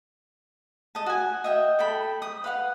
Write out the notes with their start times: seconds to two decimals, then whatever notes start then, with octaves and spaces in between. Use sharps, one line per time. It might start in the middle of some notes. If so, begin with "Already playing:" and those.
0.95 D#5 A5
1.06 F#4 G#5
1.44 D#5 E5 G5
1.79 A4 G5 B5
2.22 D#6
2.44 B4 F5 F#5